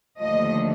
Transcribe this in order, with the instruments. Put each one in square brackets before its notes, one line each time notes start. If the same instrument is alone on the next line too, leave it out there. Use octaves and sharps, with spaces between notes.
[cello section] D#2 D3 F3 A3 D#5